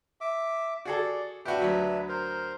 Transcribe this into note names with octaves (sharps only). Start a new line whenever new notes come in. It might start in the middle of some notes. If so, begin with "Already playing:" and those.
E5 D6
F#4 G#4 A4 D5
D4 F#4 G4 B4 E5
D2 F#3
A#4 C5